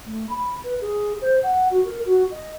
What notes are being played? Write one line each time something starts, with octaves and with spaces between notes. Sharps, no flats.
A3
B5
B4
G#4
C5
F#5
F#4
A#4
F#4
D#5